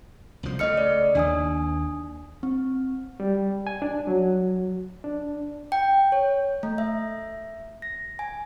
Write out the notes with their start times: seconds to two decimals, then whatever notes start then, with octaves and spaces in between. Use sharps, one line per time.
0.43 C2 F3
0.59 C#3 A3 D#5 F6 C#7
0.77 D5
1.15 D#2 D4 G#5 D#6
2.43 C4
3.20 G3
3.67 G#5
3.82 D4
4.07 F#3
5.04 D4
5.72 G5
6.12 C#5
6.63 A3
6.78 E5
7.82 A#6
8.19 G#5